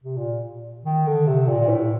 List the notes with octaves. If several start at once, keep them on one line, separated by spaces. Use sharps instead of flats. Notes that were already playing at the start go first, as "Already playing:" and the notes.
C3
A#2
D#3
D3
C3
A#2
A#2
A2